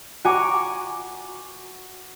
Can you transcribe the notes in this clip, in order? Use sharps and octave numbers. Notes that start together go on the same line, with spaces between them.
F#4 G#5 A#5 C#6 D6